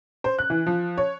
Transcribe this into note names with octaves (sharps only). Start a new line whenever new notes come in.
C5
F#6
E3
F3
C#5